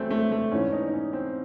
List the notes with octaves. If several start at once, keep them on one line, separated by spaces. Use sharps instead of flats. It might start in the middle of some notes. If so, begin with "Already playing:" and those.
Already playing: E2 F#3 A3 C4
A3
A3
G#2 E3 C#4
D#4
D#4
C#4
C4